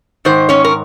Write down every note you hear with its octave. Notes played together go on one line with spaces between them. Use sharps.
G#2 D#3 C5
C#4 C#5
A#4